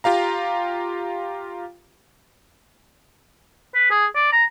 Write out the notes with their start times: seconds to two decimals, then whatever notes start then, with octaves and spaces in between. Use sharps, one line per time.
0.04 F4 G4 F5 A#5
3.75 B4
3.91 G#4
4.15 D5
4.33 A#5